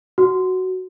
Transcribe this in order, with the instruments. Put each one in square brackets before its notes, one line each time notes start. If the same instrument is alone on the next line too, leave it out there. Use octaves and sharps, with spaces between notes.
[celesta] F#4